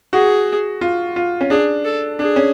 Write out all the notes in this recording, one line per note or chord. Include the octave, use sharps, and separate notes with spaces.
F#4 G#4
F4
F4
C#4
D4 G#4
A4
D4 G#4
C#4